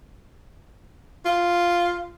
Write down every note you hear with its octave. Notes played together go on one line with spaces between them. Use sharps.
F4